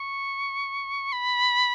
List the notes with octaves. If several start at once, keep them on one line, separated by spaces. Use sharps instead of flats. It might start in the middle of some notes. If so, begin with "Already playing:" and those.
Already playing: C#6
B5